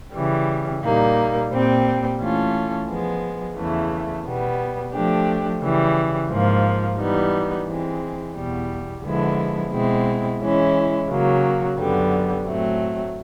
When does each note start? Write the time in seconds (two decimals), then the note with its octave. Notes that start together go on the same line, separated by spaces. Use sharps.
0.14 C#3 E3 G3
0.82 A#2 G3 A#3 D#4
1.51 A#2 G3 C4
2.19 E3 A3 C#4 F4 A4
2.88 F3 G#3 B3
3.57 E2 C#3 E3 A3
4.25 B2 G3 B3
4.93 F3 A3 D4 G4
5.62 C#3 E3 G3
6.30 G#2 F3 A#3
6.98 E3 G3 B3 D#4
7.67 E3 G#3 C4
8.36 E2 B2 G3
9.03 D3 F3 G#3 B3 E4
9.72 B2 G#3 C4 E4
10.41 E3 G#3 C#4 E4
11.09 C#3 F#3 A#3
11.78 F#2 D3 G3 B3
12.46 A2 F#3 A3 C4